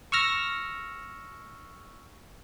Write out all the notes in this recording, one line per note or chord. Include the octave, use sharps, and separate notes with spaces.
C#6 E6 F6 A#6